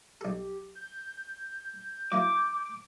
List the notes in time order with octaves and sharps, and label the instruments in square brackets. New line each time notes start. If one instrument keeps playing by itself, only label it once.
[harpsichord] B1 A4 [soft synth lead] G4
[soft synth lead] G6
[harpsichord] F#3 A#3 E4 [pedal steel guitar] D6